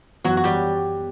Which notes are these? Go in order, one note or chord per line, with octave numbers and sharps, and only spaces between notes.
F#2 E3 F#3 B3 F#4
F#4
G3 G4